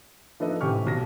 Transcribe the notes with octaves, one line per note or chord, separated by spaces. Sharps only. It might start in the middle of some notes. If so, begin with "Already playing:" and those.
F3 D4 D#4 A4 B4 D#5
A1 C3 G4 G#5 C#6 F6
B1 A#6